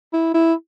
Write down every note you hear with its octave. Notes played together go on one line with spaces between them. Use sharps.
E4
E4